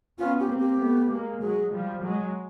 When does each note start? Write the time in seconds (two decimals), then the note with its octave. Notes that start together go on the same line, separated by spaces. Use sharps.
0.19 B3 C#4 F4
0.40 G4
0.50 A#3 C4
0.59 G4
0.79 A3 B3
1.10 G#3 A#3
1.41 F#3 G#3 G#4
1.72 F3 G3
2.03 F#3 G#3